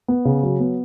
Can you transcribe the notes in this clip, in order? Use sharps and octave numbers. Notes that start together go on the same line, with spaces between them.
B3
C#3
F#3
B3